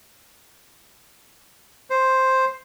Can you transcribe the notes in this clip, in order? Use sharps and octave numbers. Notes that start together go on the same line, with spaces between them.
C5